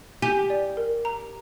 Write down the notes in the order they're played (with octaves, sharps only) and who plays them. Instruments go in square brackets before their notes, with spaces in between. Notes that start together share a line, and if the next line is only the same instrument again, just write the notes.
[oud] G4 [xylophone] G#5
[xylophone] D5
A#4
A#5